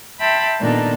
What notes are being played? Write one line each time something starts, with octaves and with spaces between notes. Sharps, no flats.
E5 G5 A5 B5 C6
A#2 D#3 B3 D4 D#4 A4